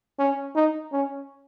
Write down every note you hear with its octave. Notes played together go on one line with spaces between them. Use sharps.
C#4
D#4
C#4